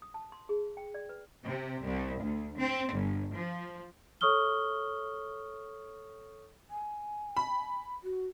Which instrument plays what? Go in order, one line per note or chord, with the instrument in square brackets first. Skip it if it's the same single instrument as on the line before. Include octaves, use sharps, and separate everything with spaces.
[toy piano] D#6
A5
C6
G#4
G5
D5
B4
[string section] C3
C2
D2
C4
G1
F3
[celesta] A4 C#5 C#6 D#6 F6 G7
[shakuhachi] G#5
[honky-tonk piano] B5
[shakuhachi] F#4